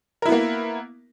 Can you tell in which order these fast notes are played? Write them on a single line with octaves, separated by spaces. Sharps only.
A#4 E4 B3 A#3